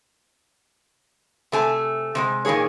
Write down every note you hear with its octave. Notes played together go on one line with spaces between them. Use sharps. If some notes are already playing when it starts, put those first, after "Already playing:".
C3 A3 G#5
C3 G3 G#3
A#2 D#3 A#3 G#4 C#5